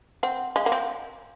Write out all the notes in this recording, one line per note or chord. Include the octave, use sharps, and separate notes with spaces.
C4 F#5
G#3 F5
A#3 F#5
C4 G#5